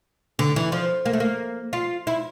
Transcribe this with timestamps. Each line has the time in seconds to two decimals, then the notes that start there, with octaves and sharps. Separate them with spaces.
0.39 D3
0.56 E3
0.72 F3
1.06 A#3
1.13 A3
1.20 A#3
1.73 F4
2.07 E4